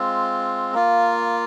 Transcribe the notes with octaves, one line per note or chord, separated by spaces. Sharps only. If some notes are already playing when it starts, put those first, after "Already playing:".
Already playing: G#3 C4 F4
A#3 F4